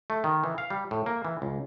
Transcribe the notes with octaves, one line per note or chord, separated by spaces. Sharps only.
A3
D#3
E3
F5
G3
A2
A#3
E3
C#2